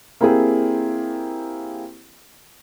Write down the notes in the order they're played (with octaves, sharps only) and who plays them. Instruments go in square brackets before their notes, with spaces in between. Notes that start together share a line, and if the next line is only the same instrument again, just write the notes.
[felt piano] A#3 C4 E4 G4 G#4